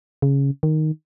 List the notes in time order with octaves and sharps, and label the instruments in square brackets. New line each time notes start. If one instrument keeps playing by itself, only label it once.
[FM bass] C#3
D#3